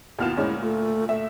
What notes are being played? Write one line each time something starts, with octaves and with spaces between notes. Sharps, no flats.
D#2 B2 B3 E4 F4 F6 E7
D2 A#2 G#3 C#4 E4
A3 F4
A3 E5